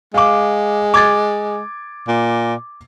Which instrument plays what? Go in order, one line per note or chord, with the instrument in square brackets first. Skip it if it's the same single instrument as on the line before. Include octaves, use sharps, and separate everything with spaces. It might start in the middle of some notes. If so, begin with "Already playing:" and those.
[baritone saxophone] G#3 [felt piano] F5 D6
[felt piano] D6 G#6 A6
[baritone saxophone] A#2